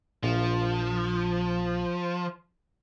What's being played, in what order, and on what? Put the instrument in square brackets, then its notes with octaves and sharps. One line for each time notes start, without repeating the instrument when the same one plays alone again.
[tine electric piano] A#1 [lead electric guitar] F3